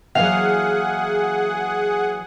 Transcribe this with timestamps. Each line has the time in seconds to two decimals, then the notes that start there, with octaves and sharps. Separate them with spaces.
0.15 E3 F#3 A#3 G#4 F5 F#5